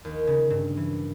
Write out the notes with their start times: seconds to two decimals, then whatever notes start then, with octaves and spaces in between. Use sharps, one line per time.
0.05 D#2
0.27 C#3
0.50 G2
0.77 E3